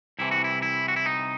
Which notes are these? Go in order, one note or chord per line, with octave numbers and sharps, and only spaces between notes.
C2 C3 E3 E4
F#4
E4
E4
F#4
E4
D#4